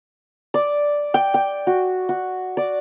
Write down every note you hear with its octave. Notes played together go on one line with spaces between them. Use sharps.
D5
G5
G5
F#4
F#4
D5